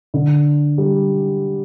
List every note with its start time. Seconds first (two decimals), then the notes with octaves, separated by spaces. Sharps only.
0.14 D3
0.78 G3